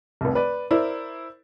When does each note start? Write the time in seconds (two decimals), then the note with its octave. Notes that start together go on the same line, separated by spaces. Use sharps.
0.21 F1 C2
0.35 B4 D5
0.71 E4 A#4 C5 D5